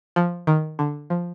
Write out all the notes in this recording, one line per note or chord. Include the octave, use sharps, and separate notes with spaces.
F3
D#3
D3
F3